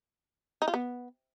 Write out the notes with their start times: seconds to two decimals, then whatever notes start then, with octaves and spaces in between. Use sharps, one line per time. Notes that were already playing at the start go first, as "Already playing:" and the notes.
0.62 D#4
0.68 F4
0.74 B3